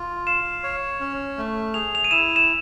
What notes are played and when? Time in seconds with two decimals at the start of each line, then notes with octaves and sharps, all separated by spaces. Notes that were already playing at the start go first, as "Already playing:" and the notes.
Already playing: F4
0.27 F5 E7
0.63 C#5
1.00 C#4
1.37 A3
1.74 G#4 F7
1.95 F7
2.04 D#7
2.11 E4 E7
2.36 E7